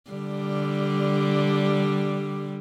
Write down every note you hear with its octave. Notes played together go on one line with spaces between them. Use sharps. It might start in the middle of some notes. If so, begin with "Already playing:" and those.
D3 G3